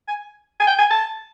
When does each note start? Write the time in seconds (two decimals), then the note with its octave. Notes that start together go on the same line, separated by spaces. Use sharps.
0.08 G#5
0.60 G#5
0.67 G5
0.79 G#5
0.91 A5